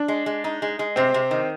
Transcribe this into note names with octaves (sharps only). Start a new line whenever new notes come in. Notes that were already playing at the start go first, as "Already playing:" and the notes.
Already playing: D4
G#3
G#3
D#4
G#3
G#3
C3 C4
C3
D#3